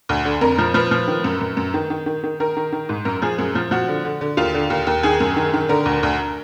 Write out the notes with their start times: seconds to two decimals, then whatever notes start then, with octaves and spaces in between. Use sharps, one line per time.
0.09 D2
0.25 D3
0.41 F2 A#4
0.58 F3
0.74 F3 B4
0.91 F3
1.08 D#3
1.24 F#2
1.41 F#2
1.57 F#2
1.74 D#3
1.90 D#3
2.06 D#3
2.23 D#3
2.40 D#3 A#4
2.57 D#3
2.72 D#3
2.89 G#2
3.05 F#2 A#4
3.22 F3 G#4
3.38 F#2 G#4
3.55 F3
3.71 F3 F#4
3.88 D3
4.05 D3
4.21 D3
4.37 D#2 F4
4.54 D3
4.70 D#2
4.87 D#2
5.03 D#3 G#4
5.20 F#2
5.36 D#3
5.54 D#3
5.69 D3 A#4
5.86 D2
6.03 D2